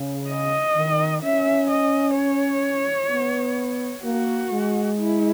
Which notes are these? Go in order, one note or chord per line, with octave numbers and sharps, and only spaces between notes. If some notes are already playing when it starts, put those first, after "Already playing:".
Already playing: C#3
D#5
D#3
C#4 E5
D#5
C#5
B3
A#3 F#4
G#3
E4